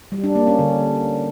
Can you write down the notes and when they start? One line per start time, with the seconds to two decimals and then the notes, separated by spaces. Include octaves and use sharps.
0.12 G3
0.24 D4
0.35 A#3
0.47 C#4
0.59 D3